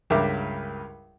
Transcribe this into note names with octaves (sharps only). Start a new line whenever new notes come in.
C#2 G2 A#4 E5 D6